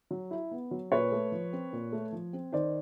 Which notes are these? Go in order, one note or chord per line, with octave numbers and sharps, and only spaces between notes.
F#3
E4
B3
F#3
A#2 B4 C#5
A3
F3
C4
A#2
A3
F3
C4
D#3 C5 D5